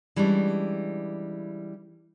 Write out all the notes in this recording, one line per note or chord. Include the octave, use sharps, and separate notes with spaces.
E3 G3 G#3 C#4 D4